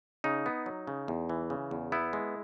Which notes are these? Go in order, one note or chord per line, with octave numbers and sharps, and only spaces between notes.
C#3 D#4
B3
F#3
C#3
E2
E3
C#3
E2
B3 E4
G#3